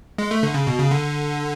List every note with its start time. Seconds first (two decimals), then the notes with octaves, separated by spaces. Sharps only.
0.18 G#3
0.31 A3
0.43 D3
0.54 C#3
0.67 B2
0.79 C#3
0.91 D3